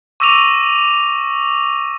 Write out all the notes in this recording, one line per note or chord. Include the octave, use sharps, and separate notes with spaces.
C#6 D6 E6 A#6 D#7 F7